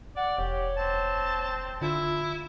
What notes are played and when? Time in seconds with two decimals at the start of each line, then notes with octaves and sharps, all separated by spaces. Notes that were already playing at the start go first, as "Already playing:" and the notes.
0.16 D5 F#5
0.38 E1 G4 C#5
0.77 C4 A5
1.82 D3 E4 F4